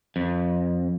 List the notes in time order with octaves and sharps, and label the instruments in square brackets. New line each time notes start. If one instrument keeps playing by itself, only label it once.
[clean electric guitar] F2